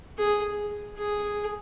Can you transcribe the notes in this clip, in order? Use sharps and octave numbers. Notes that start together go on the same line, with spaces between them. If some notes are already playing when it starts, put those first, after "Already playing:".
G#4
G#4